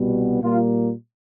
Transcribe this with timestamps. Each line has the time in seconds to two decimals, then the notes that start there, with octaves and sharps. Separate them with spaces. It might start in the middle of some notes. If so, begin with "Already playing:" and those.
Already playing: C2 B2 G3 B3
0.43 A#2 G3 A#3 F4